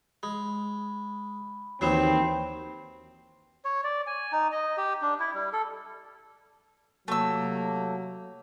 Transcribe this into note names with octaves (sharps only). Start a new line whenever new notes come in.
G#3 B5
D#2 D#3 E3 F#3 C4 B5 C7 E7
C#5
D5
G#5
D#4
D#5
G4
D4
E4
G3
A4
C3 F#3 A3 A#3 E6